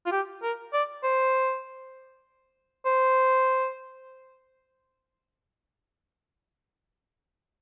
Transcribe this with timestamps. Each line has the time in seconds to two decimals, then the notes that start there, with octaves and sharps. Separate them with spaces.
0.06 F4
0.12 G4
0.43 A#4
0.73 D5
1.03 C5
2.85 C5